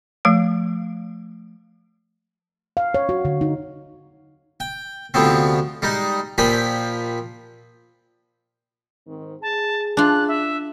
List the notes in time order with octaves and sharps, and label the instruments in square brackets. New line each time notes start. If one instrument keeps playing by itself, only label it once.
[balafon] F3 A3 F5
[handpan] F5
C#5
F#4
D3
D#4
[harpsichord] G5
D2 C3 F3 B3 C4
G3 G#3 D#4
A#2 F3 G4 G#5 B5
[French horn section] G#2 D#3 C4
[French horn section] G#4 [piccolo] A5
[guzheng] D4 F4 [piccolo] F#6
[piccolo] E5